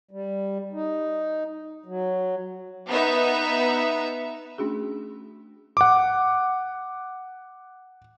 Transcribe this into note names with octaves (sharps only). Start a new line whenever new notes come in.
G3
D#4
F#3
B3 D#4 E5
A3 C#4 D4 F#4 G#4
F#5 D6